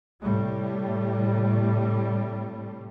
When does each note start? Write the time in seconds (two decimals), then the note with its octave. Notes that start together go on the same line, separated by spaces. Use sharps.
0.23 A2 C3 G3